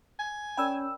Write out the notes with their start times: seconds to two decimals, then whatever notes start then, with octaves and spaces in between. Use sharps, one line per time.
0.19 G#5
0.57 C#4 A#4 D5 G5 B5 E6